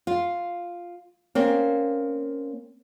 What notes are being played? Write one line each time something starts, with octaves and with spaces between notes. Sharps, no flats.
F4
A#3 C4 C#4